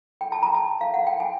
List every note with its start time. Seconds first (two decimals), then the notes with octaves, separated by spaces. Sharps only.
0.21 G5
0.32 A5
0.43 A#5
0.54 A5
0.81 F5
0.94 F#5
1.07 G5
1.20 G#5